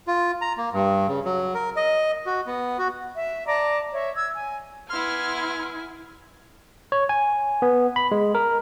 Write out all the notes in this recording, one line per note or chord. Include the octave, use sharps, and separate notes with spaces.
F4
A#5
A#3
G2
C#3
F#3
A#4
D#5
F#4
B3
F#4
E5
D5 A5 A#5 D6
C#5 E5
E6 G#6
G#5
B3 E4 G#5 C6 F6
C#5
G#5
B3
B5
G#3
A#4